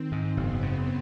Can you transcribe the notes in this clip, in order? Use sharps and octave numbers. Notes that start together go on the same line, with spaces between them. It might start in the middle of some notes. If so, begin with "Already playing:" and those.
Already playing: D#3 C4
G#2
F#1 B3
C#3